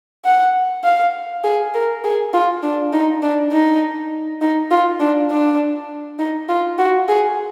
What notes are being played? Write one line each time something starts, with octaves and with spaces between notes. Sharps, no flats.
F#5
F5
G#4
A#4
G#4
F4
D4
D#4
D4
D#4
D#4
F4
D4
D4
D#4
F4
F#4
G#4